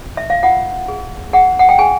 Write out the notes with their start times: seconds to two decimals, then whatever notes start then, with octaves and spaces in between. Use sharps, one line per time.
0.17 E5
0.30 F5
0.43 F4 F#5
0.88 G#4
1.33 G#4 F#5
1.59 F#5
1.69 G5
1.79 G#4 G#5